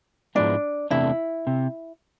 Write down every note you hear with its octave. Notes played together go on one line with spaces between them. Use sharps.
G#2 F3 G#3 B3 D4 E4
E2 C3 E3 A3 D4 E4
C3